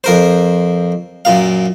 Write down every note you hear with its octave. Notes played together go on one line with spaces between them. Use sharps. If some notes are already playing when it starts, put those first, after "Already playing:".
F2 A#4 C5
F#2 A#2 F5